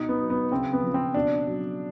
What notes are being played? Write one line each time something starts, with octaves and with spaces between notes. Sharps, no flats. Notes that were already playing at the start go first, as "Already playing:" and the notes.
Already playing: B2 D#4
B3
F#3
B3
C#3 C4
B3
F3
C4
B2 D4
F#3